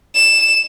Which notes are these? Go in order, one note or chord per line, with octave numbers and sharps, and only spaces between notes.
E7